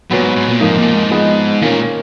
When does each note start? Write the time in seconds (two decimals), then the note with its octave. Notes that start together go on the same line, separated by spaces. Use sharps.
0.11 A#2 F#3 B3 F#4 B4
0.23 G#2
0.36 G#2
0.49 A#2
0.60 F2 G#2 F3 A#3 D#4
0.78 A#2
0.94 G#2
1.11 F3 B3 D#4 G#4 D#5
1.61 A#2 D#3 A#3 C#4